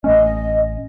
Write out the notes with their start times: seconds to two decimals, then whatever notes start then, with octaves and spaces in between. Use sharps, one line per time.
0.04 A1 A3 C#4 D#5